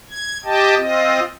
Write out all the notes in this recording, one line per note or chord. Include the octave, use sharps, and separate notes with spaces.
G#6
G4 D#5 G5 A5
C4 F4 D#5